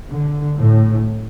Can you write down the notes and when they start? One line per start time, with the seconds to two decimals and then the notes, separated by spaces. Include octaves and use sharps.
0.10 D3
0.59 A2